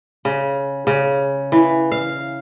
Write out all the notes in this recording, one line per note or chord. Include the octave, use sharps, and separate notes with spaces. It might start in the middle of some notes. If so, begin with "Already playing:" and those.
C#3
C#3
E3
F5